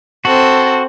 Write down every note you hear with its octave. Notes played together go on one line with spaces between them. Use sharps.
C4 F#4 A4